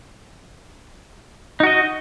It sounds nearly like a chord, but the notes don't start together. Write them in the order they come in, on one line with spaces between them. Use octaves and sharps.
D#4 F#4 D#5